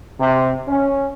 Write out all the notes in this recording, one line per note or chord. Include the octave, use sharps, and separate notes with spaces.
C3
C#4